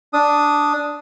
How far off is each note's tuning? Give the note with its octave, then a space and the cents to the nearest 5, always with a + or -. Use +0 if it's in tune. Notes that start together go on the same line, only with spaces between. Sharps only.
D4 +0 D#6 +0